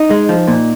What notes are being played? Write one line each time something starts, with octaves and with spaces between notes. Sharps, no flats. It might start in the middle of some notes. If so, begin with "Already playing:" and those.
Already playing: D#4
G#3
F3
A#2